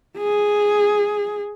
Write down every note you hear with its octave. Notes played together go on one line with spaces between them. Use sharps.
G#4